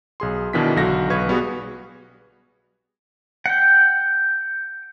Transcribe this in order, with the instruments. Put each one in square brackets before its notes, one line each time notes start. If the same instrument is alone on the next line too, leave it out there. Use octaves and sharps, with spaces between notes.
[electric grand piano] B1 G#4 C6
B2 D#3 E3 D4 E4 B6
B1 D3 F#4 A#6
B1 B4 C#6 G#6
G3 B3 F#4 G#4
[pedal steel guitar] F#5 G5